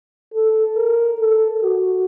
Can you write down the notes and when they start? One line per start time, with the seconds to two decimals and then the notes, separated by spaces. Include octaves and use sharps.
0.34 A4
0.77 A#4
1.20 A4
1.63 F#4